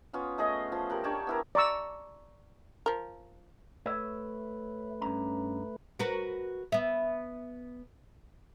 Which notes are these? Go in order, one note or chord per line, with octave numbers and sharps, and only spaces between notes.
B3 C#4 F4
A3 G#4 C#5 D#5
F3
G4 A#4 F#5
D4 G4 C#5 A5
B3 E4 A#4
D5 A#5 C#6 E6
F3 A#4
A3 B4 C#5 E5
G2 C#4 A#5
F#4 A#4 B4
B3 E5